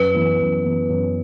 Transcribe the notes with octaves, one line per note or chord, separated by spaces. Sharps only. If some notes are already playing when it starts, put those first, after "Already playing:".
Already playing: F#2 B4
E3 B3
F#2
E3 B3
F#2